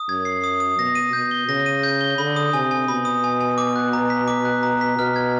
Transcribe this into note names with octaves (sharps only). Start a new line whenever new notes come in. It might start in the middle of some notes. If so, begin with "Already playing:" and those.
Already playing: D#6
F#2 G#6
C7
D#6
D#6
B2 A#6
D#7
B2 G6
G7
C#3 A#6
D#7
G6
G7
D3 B5
D#6
C3 G#5
G#5
B2 B5
D#6
G#5
G#5
D6
F#6
A#5
B6
D6
F#6
A#5
B6
B2 F6
G#6